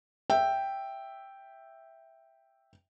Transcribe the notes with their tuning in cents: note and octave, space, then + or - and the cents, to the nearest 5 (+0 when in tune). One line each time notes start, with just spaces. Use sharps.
E5 +0 G5 +0